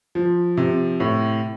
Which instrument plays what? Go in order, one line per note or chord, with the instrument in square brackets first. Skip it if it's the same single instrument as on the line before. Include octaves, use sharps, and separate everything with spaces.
[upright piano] F3
C3
A2